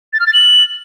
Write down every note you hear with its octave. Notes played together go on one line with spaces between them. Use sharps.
A6
F6
A6
F#7